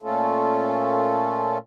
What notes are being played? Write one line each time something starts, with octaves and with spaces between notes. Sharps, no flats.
A#2 A3 C#4 F4 A4